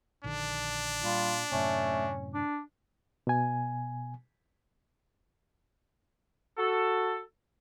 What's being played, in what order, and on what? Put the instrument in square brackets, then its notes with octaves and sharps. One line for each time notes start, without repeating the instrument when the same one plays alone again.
[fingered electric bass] A#1 D3 D#3 [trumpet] D4
[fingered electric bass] A#2 [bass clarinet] G3 [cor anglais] F4
[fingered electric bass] F#2 A2 C3 [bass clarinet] A3 [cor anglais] C#4
[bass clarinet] D4
[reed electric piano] B2 G#5
[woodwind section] F#4 A4